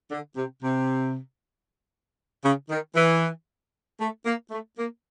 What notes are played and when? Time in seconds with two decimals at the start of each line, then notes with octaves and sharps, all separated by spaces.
0.10 D3
0.36 C3
0.62 C3
2.44 C#3
2.70 D#3
2.95 E3
3.99 A3
4.25 A#3
4.51 A3
4.77 A#3